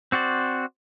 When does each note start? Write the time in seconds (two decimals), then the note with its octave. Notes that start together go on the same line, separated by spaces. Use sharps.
0.12 C4 F#4 C5 D5